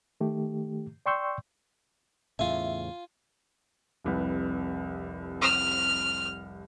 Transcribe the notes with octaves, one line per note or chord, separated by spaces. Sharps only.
D#3 A3 G4
D5 G5 C6 C#6 E6 G6
E2 A2 C#3 F4 E5 G#5
F1 C2 B4
F6